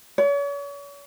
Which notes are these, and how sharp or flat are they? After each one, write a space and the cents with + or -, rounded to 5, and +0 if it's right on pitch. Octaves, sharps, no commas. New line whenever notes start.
C#5 +40